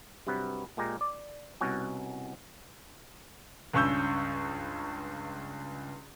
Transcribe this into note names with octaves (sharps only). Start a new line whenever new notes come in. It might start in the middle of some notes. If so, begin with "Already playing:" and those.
G2 C3 F#3 B4
A#2 G#3 G4 A#5
D5
C2 B2 C#4 F#4
C#2 G2 C#4 C#6 E6 G6